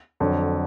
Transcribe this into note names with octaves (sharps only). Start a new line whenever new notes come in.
F2 D3 F#3